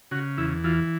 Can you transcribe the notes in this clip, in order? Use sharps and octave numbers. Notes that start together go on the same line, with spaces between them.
C#3 F#4
E2 E4
E3 F4